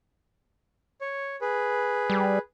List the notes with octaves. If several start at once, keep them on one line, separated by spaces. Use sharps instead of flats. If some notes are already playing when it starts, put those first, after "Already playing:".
C#5
G#4 B4
G3